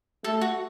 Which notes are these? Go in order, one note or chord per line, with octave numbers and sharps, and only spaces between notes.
A3 A4
F#4